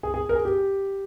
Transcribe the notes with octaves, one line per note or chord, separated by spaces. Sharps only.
G#4
G#4
A#4
G#4
G4